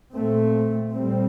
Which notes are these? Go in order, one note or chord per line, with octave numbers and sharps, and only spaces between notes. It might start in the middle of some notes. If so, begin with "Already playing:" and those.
A#2 A3 C4
A#2 G3 C4